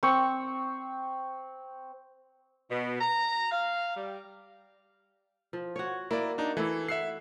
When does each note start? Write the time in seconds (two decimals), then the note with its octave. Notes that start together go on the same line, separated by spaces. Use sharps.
0.03 C4 C#6
2.71 B2
3.01 A#5
3.51 F5
3.96 G3
5.53 F3
5.76 F#4 C#5
6.11 A#3 E4 D5
6.38 D4 D#4
6.57 E3 A3 E4
6.89 E5 F#5 E6 C7